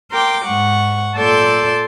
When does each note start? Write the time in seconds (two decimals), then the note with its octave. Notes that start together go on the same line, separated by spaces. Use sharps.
0.12 A#4 G5 C6 D6
0.45 G#2 F#5 C#6
1.18 A#2 A4 D5 C6 E6 G6